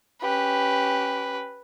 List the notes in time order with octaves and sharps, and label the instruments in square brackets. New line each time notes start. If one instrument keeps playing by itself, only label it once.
[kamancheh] C#4 G4 [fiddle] B4